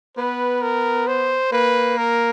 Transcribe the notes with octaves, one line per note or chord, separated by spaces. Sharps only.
B3 B4
A#4
C5
A#3 B4
A#4